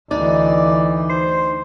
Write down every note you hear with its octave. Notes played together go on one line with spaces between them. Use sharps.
D2 E3 D#4 D5
C5